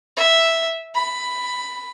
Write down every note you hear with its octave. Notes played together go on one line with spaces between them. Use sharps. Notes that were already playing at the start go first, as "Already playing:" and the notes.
E5
B5